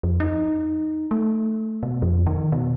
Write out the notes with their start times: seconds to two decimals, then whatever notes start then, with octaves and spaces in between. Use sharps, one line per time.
0.03 F2
0.20 D#4
1.11 A3
1.83 B2
2.02 F2
2.26 D#3
2.52 B2